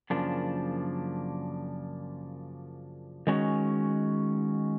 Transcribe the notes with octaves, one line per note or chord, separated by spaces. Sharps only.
F#2 C#3 F3 A#3 D4
D#3 G#3 C#4 F#4